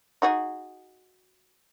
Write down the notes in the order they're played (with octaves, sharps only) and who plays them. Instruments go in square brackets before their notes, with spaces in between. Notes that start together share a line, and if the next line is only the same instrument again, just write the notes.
[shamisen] D#4 F#4 G#4